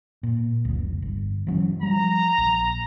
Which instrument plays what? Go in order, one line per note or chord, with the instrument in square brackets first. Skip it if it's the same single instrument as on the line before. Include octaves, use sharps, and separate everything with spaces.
[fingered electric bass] A#2
F1 C#2
G1
E3 F#3 C#4
[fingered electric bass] F3 G3 [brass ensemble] A#5
[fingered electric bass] A#1